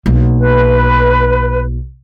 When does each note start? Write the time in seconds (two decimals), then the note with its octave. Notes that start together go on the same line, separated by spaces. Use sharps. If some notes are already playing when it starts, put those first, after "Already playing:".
0.06 B1 A#3
0.39 B4